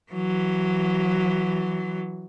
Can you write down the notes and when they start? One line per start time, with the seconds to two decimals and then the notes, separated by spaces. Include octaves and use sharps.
0.12 E3 F#3